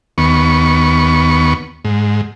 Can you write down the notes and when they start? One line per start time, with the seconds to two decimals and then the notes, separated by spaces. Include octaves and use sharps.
0.18 D#2 B3 C#6
1.85 G#2